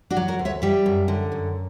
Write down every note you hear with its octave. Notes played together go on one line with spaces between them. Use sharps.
D4 F#4
F#3
F#4 A#4
D2
C#5 E5
G3 E5 G5
F#2
D3
F#2